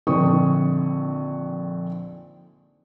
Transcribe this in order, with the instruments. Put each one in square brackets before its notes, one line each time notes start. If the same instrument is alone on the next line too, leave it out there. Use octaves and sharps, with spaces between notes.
[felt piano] A#1 D3 D#3 C4 C#6 D#6